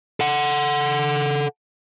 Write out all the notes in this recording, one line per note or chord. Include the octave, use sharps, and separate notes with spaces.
A4 F#5